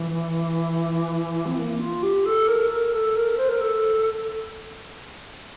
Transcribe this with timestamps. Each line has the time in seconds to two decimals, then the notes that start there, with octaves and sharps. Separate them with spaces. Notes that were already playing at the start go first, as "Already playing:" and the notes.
Already playing: E3
1.46 C4
1.57 A#3
1.79 F4
2.03 G4
2.26 A4
2.48 A#4
2.71 A#4
2.93 A4
3.16 A#4
3.38 C5
3.49 A#4
3.61 A4